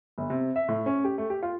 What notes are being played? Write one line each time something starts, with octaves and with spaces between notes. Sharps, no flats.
G1
C3
E5
A2
C#4
G4
A3
G4
F4